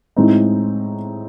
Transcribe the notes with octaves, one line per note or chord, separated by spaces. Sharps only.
A2 G#3 C4 D#4